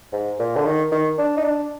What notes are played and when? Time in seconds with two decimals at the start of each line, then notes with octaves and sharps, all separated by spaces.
0.13 G#2
0.40 A#2
0.56 D3
0.65 D#3
0.92 D#3
1.18 D4
1.37 D#4
1.45 D4